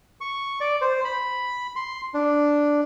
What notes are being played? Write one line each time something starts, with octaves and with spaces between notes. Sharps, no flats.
C#6
D5
C5
B5
C6
D4